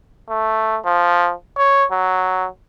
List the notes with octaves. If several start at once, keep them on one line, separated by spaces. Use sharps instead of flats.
A3
F3
C#5
F#3